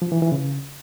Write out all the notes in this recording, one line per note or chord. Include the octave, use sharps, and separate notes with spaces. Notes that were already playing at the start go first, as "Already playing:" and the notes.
F3
E3
E3
C#3